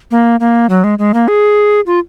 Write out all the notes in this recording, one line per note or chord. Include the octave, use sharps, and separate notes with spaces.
A#3
A#3
F#3
G#3
G#3
A#3
G#4
F4